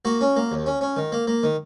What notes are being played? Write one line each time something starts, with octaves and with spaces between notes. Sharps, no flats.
A#3 F#4
C#4
A#3
D#2
C#4
C#4
D#3
A#3
A#3
D#3